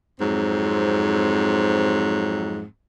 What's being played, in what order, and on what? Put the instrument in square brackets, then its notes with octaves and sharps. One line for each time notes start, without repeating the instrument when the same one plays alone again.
[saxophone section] F2 G#2 F#3 C4